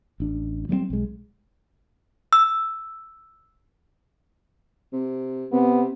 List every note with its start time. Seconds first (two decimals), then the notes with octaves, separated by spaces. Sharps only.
0.20 A1 D4
0.69 F#3 G3 A#3 C4
0.90 B1 G#3
2.33 E6
4.93 C3
5.52 C3 B3